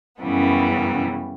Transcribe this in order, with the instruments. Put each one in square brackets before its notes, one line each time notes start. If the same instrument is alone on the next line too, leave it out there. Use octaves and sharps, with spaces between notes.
[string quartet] F#2 C#3 E3 G3 B3